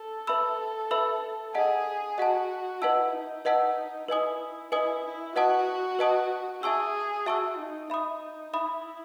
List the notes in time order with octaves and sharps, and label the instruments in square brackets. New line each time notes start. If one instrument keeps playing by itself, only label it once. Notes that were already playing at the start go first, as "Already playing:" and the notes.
Already playing: [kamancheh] A4
[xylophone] B4 E5 B5 E6
B4 E5 B5 E6
[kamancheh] G#4 [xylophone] D#5 F#5 A5
[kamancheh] F#4 [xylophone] D#5 F#5 A5
[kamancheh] E4 [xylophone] B4 D#5 F#5 A5 E6
[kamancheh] D#4
[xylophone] B4 D#5 F#5 A5 E6
[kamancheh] E4 [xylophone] B4 D#5 G#5 D#6
[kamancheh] E4 [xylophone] B4 D#5 G#5 D#6
[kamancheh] E4
[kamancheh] F#4 [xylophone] B4 D#5 F#5 A5 D#6
[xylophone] B4 D#5 F#5 A5 D#6
[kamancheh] G#4 [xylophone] E5 A5 C#6 E6
[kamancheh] F#4 [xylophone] E5 A5 C#6 E6
[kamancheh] D#4
[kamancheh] D#4 [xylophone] E5 B5 D#6
[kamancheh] E4 [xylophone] E5 B5 D#6